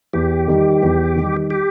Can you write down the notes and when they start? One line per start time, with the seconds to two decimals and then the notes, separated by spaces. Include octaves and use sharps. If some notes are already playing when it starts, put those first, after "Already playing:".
0.13 E2 G4
0.47 D#3 G3 D#4
0.82 E2
1.16 D#3 G3 D#4
1.50 G4